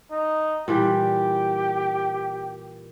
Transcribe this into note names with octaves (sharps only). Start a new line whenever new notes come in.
D#4
A#2 E3 G3 G4